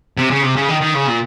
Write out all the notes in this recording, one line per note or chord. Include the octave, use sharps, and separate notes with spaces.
C3
C#3
C3
C#3
D#3
D#3
C#3
A#2